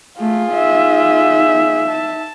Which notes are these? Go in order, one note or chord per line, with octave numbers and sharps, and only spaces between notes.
A3 F4 G#4
D#4 E5
A5